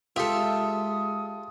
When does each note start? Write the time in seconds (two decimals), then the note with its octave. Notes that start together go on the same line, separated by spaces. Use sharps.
0.16 G#3 F4 G4 A4 E5 D#6